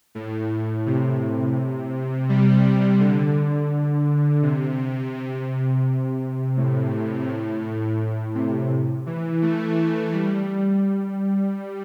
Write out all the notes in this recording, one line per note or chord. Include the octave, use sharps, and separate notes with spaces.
A2
C3
G3
D3
C3
C3
A2
C3
E3
A3
G3